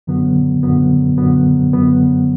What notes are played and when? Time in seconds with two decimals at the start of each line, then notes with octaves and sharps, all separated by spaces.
0.07 F#2 D3 F#3 B3
0.63 F#2 D3 F#3 B3
1.18 F#2 D3 F#3 B3
1.73 F#2 D3 F#3 B3